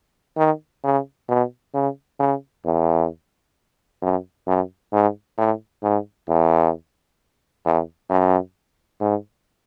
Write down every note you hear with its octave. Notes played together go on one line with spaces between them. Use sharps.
D#3
C#3
B2
C#3
C#3
E2
F#2
F#2
G#2
A2
G#2
E2
E2
F#2
G#2